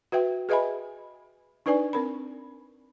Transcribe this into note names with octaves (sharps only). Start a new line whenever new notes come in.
F#4 B4 E5 G5
G#4 B4 D#5 E5 G#5 B5
D4 D#4 B4 D5 G#5
C4 A#4 B5